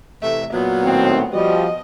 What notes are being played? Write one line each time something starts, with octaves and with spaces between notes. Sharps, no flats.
C3 E3 A3 E5
A#2 F#3 B3
A2 D#3 C4
F3 G3 F#4 D#5